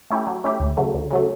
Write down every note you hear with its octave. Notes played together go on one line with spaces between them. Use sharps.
A3 C#4 E4 G4
F#3
A3 C#4 E4 G4
D2
C#3 F#3 A3
D2
C#3 F#3 A3